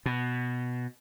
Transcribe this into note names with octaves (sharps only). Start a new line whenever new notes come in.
B2